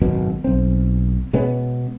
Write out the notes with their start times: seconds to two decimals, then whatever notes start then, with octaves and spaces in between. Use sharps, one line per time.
0.01 G#1 F#2 B2 C#4
0.44 B1 C4
1.33 B2 G#3 B3 C#4